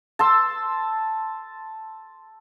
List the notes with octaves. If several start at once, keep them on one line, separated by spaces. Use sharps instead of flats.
A5 C6 E6